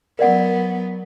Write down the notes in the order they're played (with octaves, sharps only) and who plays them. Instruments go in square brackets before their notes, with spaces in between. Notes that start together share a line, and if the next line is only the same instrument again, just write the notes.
[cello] F#3 B3 [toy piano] A#4 D5 F#5